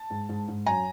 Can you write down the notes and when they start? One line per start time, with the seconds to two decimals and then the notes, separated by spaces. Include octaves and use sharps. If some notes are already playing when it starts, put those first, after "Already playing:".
Already playing: A5
0.10 G#2
0.29 G#2
0.48 G#2
0.66 F#2 G#5 A#5